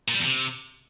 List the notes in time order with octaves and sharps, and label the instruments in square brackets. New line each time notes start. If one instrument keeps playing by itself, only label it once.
[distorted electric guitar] A#2
G3
E2
C3